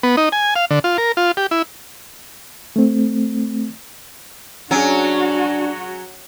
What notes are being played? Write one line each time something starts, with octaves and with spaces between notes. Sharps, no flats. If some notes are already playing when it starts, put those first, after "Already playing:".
B3
D#4
G#5
F5
D3
F4
A#4
F4
G4
E4
A3 C4
F#3 C#4 D4 F#4 G#4